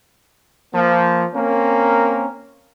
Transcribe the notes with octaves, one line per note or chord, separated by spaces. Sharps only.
F3 A#3
A#3 C4 C#4 A#4